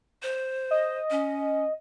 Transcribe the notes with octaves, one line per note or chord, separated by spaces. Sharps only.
C5
D#5
C#4